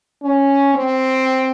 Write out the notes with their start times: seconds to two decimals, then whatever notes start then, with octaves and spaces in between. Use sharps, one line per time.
0.23 C#4
0.74 C4